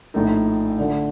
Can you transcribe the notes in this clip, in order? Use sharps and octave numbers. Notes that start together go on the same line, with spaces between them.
A#1 A2 A3 D#4 A4
D3 A3 D4 A4